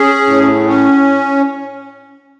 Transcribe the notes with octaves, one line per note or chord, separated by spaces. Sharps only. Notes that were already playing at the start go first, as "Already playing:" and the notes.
Already playing: C#4 G#4
A2
C#4